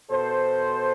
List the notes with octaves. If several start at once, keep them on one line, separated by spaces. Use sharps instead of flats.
B2 A4 C5